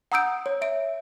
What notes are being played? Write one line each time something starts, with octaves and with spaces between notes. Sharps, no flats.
F#5 A#5 D#6 E6 G6 D7
C#5
E5 D7